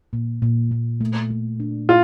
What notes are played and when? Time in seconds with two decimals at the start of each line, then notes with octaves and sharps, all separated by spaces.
0.13 A#2
0.42 A#2
0.71 A#2
1.01 A3
1.31 A3
1.60 D4
1.89 A#2 F4